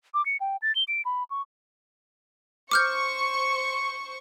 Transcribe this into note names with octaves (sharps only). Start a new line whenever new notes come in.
D6
C#7
G5
A6
G7
D7
B5
C#6
C5 C#6 D6 F6 G6